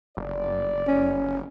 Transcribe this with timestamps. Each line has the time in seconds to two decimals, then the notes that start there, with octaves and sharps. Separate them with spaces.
0.17 F#1 D5
0.87 C#4